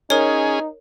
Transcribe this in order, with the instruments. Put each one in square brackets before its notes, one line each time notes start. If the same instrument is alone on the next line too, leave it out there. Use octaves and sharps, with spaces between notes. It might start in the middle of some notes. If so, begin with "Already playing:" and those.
[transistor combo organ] C#4 G#4 [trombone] D#4 [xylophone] A#4 C#5